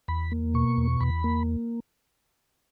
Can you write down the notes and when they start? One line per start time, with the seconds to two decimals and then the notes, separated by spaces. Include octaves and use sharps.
0.08 E2 B5
0.32 A#3
0.54 B2 C#6
0.77 E2
1.01 E2 B5
1.24 A#3